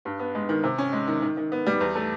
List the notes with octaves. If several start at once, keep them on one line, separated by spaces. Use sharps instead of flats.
G2
B3
G#3
D#3
C3
C#4
G#3
D#3
D#3
D#3
B3
G3
E2
A3